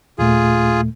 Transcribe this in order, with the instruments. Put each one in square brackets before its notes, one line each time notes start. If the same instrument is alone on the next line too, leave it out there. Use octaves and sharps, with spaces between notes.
[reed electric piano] D#2 A#2 A3 [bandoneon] F4 G#4